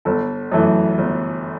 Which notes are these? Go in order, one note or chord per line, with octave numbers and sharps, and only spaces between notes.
G1 A4
F#2 E3 A3
G1